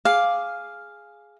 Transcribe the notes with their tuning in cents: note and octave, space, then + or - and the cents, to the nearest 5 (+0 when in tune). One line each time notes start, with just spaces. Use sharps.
G#4 +0 F5 +0 D6 +0